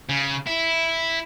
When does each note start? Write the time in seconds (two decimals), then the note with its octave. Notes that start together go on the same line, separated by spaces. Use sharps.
0.09 C#3
0.47 E4